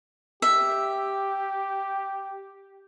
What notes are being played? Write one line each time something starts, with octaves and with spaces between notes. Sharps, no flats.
G4 E5